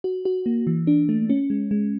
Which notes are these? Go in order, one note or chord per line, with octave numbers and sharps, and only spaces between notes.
F#4
F#4
A#3
E3
D4
A3
C#4
G#3
G#3